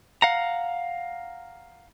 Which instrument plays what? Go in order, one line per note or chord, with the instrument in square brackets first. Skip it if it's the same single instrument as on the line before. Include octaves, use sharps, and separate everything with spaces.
[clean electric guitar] F5 F#5 A#5